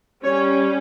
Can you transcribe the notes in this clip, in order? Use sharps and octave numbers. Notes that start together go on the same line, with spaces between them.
G3 C#4 C#5